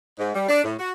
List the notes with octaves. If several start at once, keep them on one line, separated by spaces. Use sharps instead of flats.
G#2
G3
D4
A2
F#4